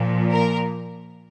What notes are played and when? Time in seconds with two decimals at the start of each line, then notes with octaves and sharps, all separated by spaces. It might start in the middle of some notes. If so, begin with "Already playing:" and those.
Already playing: A#2 F3
0.31 A#4